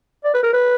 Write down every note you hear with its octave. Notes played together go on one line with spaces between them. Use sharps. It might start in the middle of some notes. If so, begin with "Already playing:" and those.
D5
B4
A#4
B4